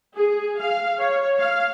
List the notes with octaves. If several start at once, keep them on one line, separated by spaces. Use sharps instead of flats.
G#4
F5
C#5
F5